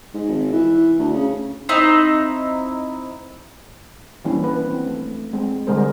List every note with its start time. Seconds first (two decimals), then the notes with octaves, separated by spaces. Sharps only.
0.14 G#2
0.29 G#1
0.52 E3
0.99 D2
1.13 C#3
1.69 C4 D#4 E4
4.25 E3 G3 A#3 C#4 D4 E4
4.44 B4
4.66 C4
4.87 A3
5.33 G#3 C4
5.67 D3 G3 G#3 A#4 C5